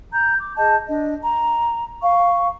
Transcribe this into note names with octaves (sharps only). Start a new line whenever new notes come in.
A#5 G6
D6
G#4 D#5 A5 G6
D4 D#5
A#5
F5 C#6